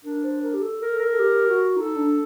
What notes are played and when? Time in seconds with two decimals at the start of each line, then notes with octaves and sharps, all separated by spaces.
0.04 D4 A#4
0.23 C5
0.42 A#4
0.54 G4
0.62 A4
0.81 A#4
0.90 A4
0.99 A#4
1.10 A4
1.19 G4
1.48 F#4
1.76 D#4 A4
1.96 D4